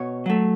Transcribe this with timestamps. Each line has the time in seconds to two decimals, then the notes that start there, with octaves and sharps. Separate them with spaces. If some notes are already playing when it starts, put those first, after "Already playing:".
Already playing: B2 C#5
0.26 F#3 A3